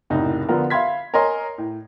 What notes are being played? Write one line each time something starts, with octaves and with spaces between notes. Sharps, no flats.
F#1 C2 A2 D#4
D3 F3 B3 F4 A#4
E5 F5 B5 C6 G#6 B6
A#4 C#5 D#5 G#5 C6
A2